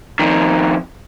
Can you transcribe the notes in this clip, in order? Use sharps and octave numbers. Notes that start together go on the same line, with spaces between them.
F2 D#3